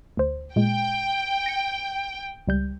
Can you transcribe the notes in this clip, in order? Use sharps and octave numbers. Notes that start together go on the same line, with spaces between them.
D2 C5
A#2 G#3 G5
A#6 C#7
C#2 G3 G6